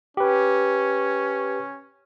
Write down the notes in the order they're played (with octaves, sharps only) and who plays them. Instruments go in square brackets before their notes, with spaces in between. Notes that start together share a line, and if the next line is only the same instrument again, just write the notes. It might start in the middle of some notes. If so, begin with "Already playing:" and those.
[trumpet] C#4 [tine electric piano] G4 B4